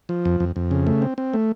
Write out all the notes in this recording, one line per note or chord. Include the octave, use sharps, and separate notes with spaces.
F3
F2
F2
F2
C#3
A3
C4
C4
A3